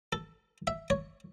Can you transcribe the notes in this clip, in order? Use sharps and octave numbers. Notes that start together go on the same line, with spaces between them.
A4
E5
C#5